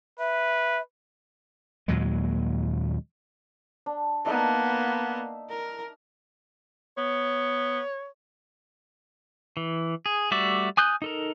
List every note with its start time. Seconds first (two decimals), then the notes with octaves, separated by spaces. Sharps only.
0.19 B4 E5
1.88 D#2 A#2 F#3 G#3
3.86 D4
4.26 A#3 B3 D4 D#4 E5
5.49 A#4
6.98 B3 C#5
9.57 E3
10.06 G#4
10.31 G3 A3 F#4 D5 E5
10.77 G#5 D#6 F#6 G6
11.02 D#4 A4 A#4